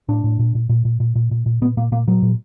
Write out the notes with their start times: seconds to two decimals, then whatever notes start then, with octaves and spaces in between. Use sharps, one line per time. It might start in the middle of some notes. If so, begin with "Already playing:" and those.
0.08 A2 D4
0.24 A2
0.39 A#2
0.55 A#2
0.69 A#2
0.85 A#2
1.00 A#2
1.15 A#2
1.31 A#2
1.46 A#2
1.62 A#2 B3
1.77 A#2 A#3
1.92 A#2 A#3
2.07 A#2 F#3
2.22 A#2